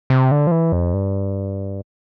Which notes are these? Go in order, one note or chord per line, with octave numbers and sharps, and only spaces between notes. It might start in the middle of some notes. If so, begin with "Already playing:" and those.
C3
D3
F3
E3
F2
G2